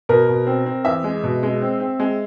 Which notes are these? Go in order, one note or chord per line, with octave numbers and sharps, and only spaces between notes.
B2 A#4
B2
C4
C4
E2 E5
G#3
B2
G#3
C4
C4
G#3